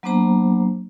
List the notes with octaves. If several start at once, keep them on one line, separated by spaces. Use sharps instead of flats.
F#3 A#3 B3 D4 C5 A#5